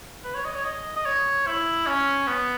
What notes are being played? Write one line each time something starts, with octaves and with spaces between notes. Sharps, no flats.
B4
C#5
D#5
C#5
D#5
D#5
C#5
E4
C#4
B3